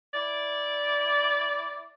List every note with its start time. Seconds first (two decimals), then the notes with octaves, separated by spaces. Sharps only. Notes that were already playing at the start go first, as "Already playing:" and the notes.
0.14 E4 D5